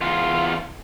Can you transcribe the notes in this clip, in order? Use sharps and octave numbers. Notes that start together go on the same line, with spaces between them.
E2 F4